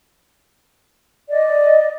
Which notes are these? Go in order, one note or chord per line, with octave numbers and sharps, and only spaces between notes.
D5 D#5